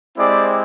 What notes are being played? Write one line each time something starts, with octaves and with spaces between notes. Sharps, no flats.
G#3 C4 E4 G4 D5